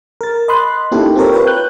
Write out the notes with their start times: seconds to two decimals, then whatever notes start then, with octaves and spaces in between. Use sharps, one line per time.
0.21 A#4 A6
0.48 D#5 B5 C6 F#6
0.91 A#3 C#4 D#4 E4 G4 A4
1.16 C4 F4 G4 A4 A#4 C#5
1.33 F4 B4 C#5 G5
1.47 F#6 G6